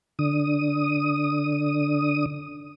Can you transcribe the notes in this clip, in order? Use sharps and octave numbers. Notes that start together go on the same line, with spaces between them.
D3 D#6